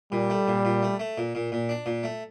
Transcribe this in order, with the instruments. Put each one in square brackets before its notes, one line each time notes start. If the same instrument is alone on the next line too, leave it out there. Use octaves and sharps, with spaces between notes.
[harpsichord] A#2 [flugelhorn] G3
[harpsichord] A3
A#2
A#2
A3
A3
A#2
A#2
A#2
D4
A#2
A3